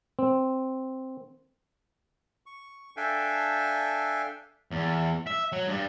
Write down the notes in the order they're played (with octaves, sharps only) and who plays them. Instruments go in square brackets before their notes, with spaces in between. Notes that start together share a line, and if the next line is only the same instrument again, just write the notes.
[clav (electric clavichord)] C4
[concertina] C#6
D4 A4 E5 F5 G5 G#5
[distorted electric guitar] E2
E5
F#3
G2 G3